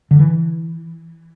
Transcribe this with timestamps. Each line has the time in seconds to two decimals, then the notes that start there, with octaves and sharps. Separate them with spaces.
0.11 D3
0.19 E3